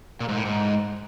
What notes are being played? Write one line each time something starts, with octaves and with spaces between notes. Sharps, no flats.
A#2
G#2
A2
G#2